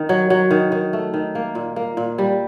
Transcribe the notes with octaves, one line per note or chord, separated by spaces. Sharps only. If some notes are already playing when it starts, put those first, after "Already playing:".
Already playing: D#3
F#3
F#3
D#3
D#3
A3
D#3
A#3
A#2
A#3
A#2
G3